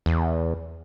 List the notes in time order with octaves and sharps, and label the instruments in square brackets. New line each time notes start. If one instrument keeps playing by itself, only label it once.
[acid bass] E2